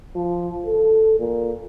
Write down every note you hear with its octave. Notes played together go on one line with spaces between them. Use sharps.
F3
A4
A#2